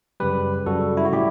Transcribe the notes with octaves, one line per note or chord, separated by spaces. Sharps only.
F#2 C#3 G3 G4 B4
F#2 C#3 G3 F#4 A4
E4
F#4
A2 G3 E4 G4